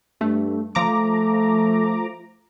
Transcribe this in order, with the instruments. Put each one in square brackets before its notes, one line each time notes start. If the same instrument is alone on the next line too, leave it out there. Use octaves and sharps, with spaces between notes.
[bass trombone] G2 [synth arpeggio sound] A3
[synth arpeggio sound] F3 A#5 D6 [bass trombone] A3